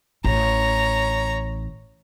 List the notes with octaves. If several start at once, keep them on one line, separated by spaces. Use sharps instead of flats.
A1 C#5 A#5